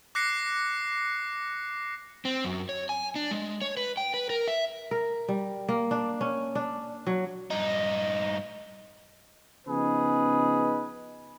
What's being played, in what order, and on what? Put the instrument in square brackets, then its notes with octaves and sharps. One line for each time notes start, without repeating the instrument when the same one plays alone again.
[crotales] D6 F#6 A#6 C7 C#7
[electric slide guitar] C4
F#2
C#5
G#5
D4
G#3
C#5
B4
G5
B4
A#4
E5
[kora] A#4
G3
A#3
D4
C#4
D4
F#3
[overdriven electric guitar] G2 D#4
[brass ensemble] C#3 F3 B3 D#4 G#4 B4